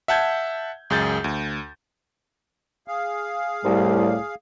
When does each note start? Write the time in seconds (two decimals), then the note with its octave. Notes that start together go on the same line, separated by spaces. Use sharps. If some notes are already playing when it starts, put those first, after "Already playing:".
0.08 E5 F#5 A5 G6 G#6
0.90 C#2 F#2 G#4 G6 A6
1.24 D2
2.88 G#4 F5
3.65 C2 A2 G3